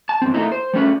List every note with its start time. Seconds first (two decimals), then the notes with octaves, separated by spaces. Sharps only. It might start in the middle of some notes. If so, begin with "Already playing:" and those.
0.09 A5
0.22 G2 C4
0.34 A3 A#3 D#4 E4
0.52 C5
0.74 G3 A3 C#4 B4